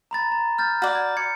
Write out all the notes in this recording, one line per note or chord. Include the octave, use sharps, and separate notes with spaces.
A#5 B5 A6
A#5
F6 G6 A6
F#4 D5
G#6
G#6 C#7